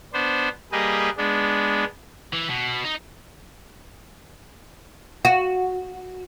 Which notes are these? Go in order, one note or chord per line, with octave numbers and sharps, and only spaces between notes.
B3 D4 C5
G3 A#3 G4 G#4 B4 D#5
G#3 B3 D4
E3
B2
D#4
F#4